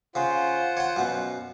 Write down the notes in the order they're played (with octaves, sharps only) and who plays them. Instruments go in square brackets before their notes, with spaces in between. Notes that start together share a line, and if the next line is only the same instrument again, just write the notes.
[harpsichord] C#3 [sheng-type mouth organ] F4 C5 [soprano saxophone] F#5
[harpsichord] C#5 G5
F#2 B2